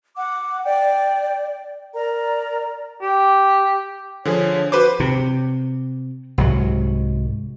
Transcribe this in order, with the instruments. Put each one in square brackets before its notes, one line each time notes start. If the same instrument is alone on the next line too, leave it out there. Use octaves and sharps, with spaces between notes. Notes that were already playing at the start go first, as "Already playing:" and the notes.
[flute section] F#5 D6
D5 G5
A#4 D5 A#5
[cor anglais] G4
[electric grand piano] D3 F3 G#4 [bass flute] C#5
[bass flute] F#4 [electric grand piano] B4 C5 D6
[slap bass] C3
C2 G#2 F#3